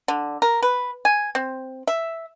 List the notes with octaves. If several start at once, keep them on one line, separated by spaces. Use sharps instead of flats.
D3
A#4
B4
G#5
C4
E5